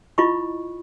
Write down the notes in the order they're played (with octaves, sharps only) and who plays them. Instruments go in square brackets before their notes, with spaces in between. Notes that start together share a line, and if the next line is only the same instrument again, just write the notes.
[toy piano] E4 F4 D#5 B5 C#6